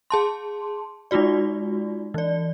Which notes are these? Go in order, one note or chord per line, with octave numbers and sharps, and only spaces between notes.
G#4 A5 C6
G#3 D#4 F4 F#4 D5
E3 D5